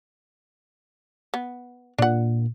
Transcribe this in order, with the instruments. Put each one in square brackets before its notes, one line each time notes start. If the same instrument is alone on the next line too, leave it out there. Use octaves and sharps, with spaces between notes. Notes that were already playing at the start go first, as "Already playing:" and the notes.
[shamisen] B3
[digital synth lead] A#2 [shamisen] D4 F#5